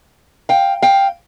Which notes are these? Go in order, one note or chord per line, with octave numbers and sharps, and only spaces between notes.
F5 G5
F5 G5